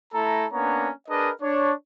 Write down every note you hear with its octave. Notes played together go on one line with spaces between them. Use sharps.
A3 E4 A4 A#5
A#3 B3 C#4 D4 C#5 A#5
D4 G#4 A#4 B4 D#5
D4 C#5